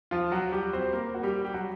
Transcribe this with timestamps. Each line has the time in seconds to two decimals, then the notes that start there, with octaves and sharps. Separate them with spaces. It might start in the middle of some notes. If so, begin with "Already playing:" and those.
0.11 F3 F4
0.32 F#3 F#4
0.52 G3 G4
0.73 C4 C5
0.93 A#3 A#4
1.15 F#4
1.23 G3 G4
1.45 G4
1.54 F#3 F#4